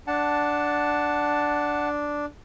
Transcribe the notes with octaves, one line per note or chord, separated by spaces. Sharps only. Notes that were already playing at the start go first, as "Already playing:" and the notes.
D4 F#5 A5